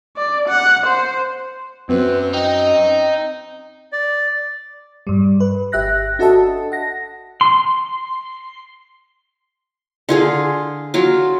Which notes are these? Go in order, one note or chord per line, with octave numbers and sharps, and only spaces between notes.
D5
F#5
C5
F#2 C4 B4
D#4 G5
D5
G2 G3
B4
G1 G4 E5 F#6 A#6
D4 F#4 A4 D#5 E5 A5
F#5 A#6
C6
D3 F4 G#4
F#3 F4